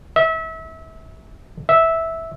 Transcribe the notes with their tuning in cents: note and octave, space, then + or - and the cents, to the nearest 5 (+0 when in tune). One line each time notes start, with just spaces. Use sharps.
E5 -30
E5 -10